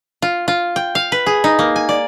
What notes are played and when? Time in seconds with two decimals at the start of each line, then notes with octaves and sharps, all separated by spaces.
0.22 F4
0.48 F4
0.76 G5
0.95 F5
1.12 B4
1.26 G#4
1.44 D#4
1.59 A#3
1.76 G#5
1.89 D5